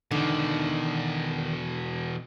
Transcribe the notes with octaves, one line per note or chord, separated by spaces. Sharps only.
E2 B2 D3 D#3